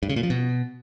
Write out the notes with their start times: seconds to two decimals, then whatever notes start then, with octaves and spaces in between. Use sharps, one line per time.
0.03 G2
0.09 C#3
0.16 A#2
0.23 F3
0.30 B2